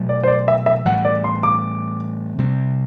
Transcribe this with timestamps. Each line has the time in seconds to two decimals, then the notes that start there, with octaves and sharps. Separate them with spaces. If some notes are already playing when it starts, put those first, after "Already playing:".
Already playing: B2 F#3 A3
0.09 D5
0.23 C5
0.28 D5
0.48 E5
0.66 E5
0.86 A2 E3 G3 F#5
1.05 D5
1.24 C6
1.43 D6
2.38 C3 G3 C4